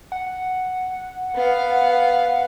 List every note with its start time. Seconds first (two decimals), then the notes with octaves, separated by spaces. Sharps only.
0.12 F#5
1.35 B3 F5